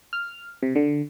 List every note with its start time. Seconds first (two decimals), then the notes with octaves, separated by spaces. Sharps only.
0.13 F6
0.63 C3
0.75 D3